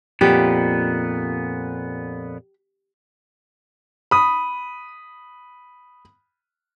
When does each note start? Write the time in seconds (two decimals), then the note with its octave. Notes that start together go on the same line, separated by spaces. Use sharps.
0.21 F2 A#2 B3 G4
4.11 B5 D#6